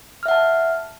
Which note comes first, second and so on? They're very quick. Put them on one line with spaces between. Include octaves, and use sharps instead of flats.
F6 E5 F#5 A5